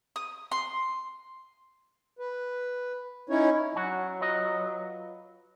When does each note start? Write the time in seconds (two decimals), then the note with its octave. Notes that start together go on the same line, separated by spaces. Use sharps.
0.16 D#6
0.52 C6
2.19 B4
3.29 C#4 D#4 E4 C#5
3.75 F#3 C#4 F#4
4.21 F4 B4 D#5